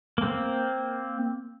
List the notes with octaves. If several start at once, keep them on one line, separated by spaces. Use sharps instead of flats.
A#3 C4